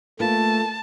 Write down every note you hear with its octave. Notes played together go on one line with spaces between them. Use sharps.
A3 A#3 F4 B4 A5